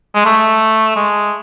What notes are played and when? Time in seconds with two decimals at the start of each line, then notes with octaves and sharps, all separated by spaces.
0.15 G#3
0.26 A3
0.96 G#3